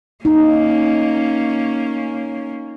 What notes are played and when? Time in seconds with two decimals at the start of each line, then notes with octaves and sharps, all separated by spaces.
0.25 A#3 C#4 D#4